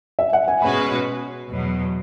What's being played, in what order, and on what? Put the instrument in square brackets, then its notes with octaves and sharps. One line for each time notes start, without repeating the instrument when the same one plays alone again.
[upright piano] E5
F#5
G#5
[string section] B2 G#3 C#4 F#4 B4 [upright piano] B5
[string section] E2 B2 F#3